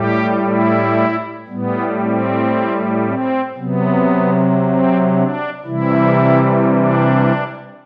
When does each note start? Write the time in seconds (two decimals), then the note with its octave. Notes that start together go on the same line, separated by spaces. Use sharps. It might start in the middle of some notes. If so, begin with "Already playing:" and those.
Already playing: A2 G3 G4
0.43 E4
1.48 A2 G3 B3
2.00 C4
3.05 C4
3.57 C3 F#3 B3
4.60 C4
5.13 D4
5.65 C3 E3 G3 E4
6.70 D4